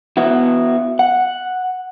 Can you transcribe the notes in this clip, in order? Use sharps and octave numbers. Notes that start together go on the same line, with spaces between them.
B3 E4 F#4
F#5